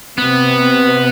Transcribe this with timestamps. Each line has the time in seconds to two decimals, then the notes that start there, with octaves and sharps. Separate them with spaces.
0.18 C3 B3